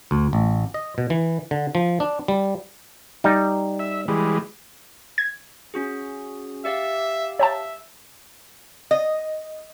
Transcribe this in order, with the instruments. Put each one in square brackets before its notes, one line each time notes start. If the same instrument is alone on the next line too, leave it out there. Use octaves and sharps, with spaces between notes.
[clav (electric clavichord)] D2
A1
D#5
B2
E3
D3
F3
D4
G3
G3 D#4
[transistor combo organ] E5
E3 G3 G#3
[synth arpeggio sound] G#6
[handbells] C#4 F#4 G#4
[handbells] G4 D5 F5 [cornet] E5
[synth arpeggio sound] C#5 G5 A5 [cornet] E5
[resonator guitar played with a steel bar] D#5